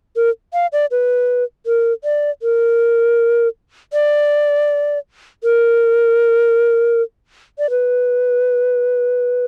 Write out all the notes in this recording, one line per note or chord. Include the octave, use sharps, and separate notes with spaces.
A#4
F5
D5
B4
A#4
D5
A#4
D5
A#4
D5
B4